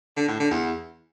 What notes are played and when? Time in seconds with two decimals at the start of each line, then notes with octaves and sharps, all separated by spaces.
0.17 D3
0.28 A2
0.40 D3
0.51 E2